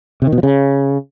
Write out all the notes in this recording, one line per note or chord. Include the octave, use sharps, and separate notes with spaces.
C3
D#3
B2
F3
C#3